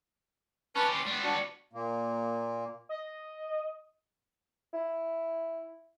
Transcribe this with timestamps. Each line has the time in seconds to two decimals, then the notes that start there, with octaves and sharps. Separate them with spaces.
0.75 C#4 G4 B4 A5
0.92 C6
1.06 G3 B3
1.23 D4 F#4
1.73 A#2 A#3
2.89 D#5
4.74 E4